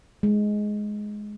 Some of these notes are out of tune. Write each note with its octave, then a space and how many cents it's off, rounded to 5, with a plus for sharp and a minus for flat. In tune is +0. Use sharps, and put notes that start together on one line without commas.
G#3 +10